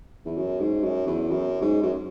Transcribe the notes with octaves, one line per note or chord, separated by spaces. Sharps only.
E2
F#2
G#2
F#2
E2
F#2
G#2
F#2